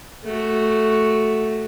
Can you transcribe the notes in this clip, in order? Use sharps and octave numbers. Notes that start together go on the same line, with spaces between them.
A3 F#4